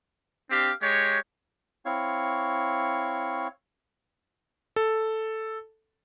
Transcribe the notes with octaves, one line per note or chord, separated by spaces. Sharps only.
C4 D4 G4 F5
G#3 G4 C#5
C4 E4 C#5 F5 C#6
A4